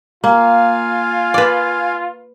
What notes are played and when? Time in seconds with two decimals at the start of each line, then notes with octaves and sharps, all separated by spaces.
0.24 A#3 F4 F5 G#5
1.34 B4 D5